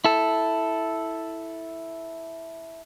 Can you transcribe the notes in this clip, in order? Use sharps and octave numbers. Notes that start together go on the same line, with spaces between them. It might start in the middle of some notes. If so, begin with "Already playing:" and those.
E4 A4